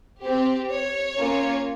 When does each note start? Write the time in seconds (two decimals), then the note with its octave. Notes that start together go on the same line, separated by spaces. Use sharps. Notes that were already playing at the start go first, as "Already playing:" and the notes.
0.23 C4 G4
0.70 C#5
1.18 A#3 C#4 F4